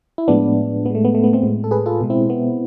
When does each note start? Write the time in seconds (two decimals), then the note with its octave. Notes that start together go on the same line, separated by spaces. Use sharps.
0.18 E4
0.28 A2 F3 G#3 B3 D4
0.85 A2 B3
0.90 G#3 A3
1.05 B3
1.15 A3
1.24 B3
1.33 A3 C4
1.43 A2 G#3
1.64 A4
1.71 G#4 B4
1.86 F4 A4
2.01 B2 G#3
2.10 C4 E4
2.30 B3